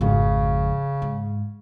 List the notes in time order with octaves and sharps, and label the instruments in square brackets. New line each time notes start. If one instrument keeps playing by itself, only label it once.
[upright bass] G#1 F2 [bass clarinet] C#3
[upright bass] G#2